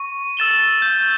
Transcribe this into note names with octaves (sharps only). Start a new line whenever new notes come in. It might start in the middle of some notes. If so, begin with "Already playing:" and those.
Already playing: C#6
E6 A6 E7 G7
G6